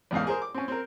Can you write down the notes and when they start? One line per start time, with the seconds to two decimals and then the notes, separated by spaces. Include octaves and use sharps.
0.11 A1 E2 G#2 F5
0.27 G#4 A#4 C5
0.42 D6
0.54 C4 C#4
0.68 C4 A#4